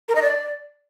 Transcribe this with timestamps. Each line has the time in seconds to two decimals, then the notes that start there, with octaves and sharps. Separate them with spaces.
0.09 A#4
0.15 D#5
0.22 D5